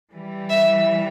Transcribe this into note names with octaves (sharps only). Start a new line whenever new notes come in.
E3 G3
E5